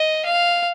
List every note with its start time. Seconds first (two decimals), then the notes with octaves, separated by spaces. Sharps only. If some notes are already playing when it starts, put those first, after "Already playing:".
Already playing: D#5
0.25 F5